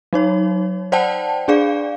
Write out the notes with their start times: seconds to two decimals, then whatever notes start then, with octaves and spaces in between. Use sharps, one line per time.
0.13 F#3 D#4 C#5
0.92 C5 D5 F#5 G5 A5
1.48 D4 G#4 D5 F5